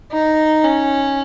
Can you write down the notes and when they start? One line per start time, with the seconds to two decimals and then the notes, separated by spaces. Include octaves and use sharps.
0.12 D#4
0.64 C#4